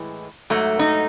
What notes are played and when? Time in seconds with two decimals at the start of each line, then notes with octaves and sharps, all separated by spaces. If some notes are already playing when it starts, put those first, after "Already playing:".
Already playing: A2 E3 G#3
0.50 G#2 F#3 A3
0.79 D#4